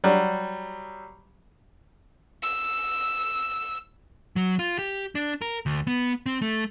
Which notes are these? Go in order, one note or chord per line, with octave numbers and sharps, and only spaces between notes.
F#3 G3
E6
F#3
F4
G4
D4
A#4
D2
B3
C4
A3